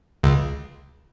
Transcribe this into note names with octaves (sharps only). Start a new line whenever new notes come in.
C#2